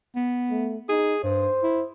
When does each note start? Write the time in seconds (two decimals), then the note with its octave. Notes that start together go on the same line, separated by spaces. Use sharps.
0.16 B3
0.51 A3
0.89 D#4 G#4
1.24 G2 C5
1.63 E4